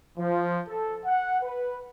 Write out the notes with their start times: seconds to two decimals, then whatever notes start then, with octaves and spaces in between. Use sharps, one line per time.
0.17 F3
0.68 A4
1.06 F#5
1.43 B4